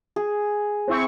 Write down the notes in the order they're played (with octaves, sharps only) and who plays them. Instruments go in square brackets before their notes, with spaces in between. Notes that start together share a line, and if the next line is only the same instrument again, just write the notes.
[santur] G#4
[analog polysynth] C4 E4 C#6